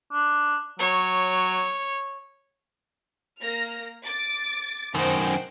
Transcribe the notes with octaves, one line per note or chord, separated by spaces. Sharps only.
D4
F#3 C#5
A#3 F6 A#6
D6 A6
F#2 D#3 C5 F#5 G5